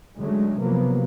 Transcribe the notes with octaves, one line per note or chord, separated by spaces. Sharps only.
D3 F#3 G#3 A3 C#4
C3 F3 F#3 A#3 B3